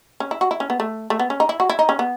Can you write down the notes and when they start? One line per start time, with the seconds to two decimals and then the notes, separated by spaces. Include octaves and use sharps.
0.20 C#4
0.31 E4
0.41 F#4
0.51 E4
0.60 C#4
0.70 B3
0.80 A3
1.10 A3
1.19 B3
1.30 C#4
1.40 D#4
1.49 E4
1.60 F#4
1.69 E4
1.79 D#4
1.89 C#4
1.99 B3